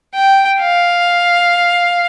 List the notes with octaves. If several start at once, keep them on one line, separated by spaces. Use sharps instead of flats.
G5
F5